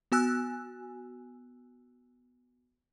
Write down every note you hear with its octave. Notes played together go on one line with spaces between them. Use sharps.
B3 F#4 G#5 E6 F#6